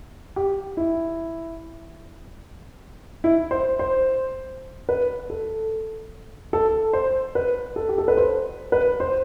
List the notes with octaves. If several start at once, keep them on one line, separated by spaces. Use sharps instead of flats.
G4
E4
E4
C5
C5
B4
A4
A4
C5
B4
A4
G4
A4
B4
C5
B4
C5